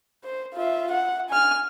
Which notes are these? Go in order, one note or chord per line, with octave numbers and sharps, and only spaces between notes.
C5
F4 E5
F#5
G#5 F6